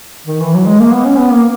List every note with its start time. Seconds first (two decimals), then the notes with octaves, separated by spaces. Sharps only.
0.27 D#3
0.40 E3
0.54 F#3
0.66 G#3
0.80 A#3
0.92 B3
1.06 C#4
1.18 B3
1.32 A#3